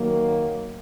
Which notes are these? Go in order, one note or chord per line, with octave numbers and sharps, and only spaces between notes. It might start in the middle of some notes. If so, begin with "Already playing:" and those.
Already playing: D#3 F#3 A#3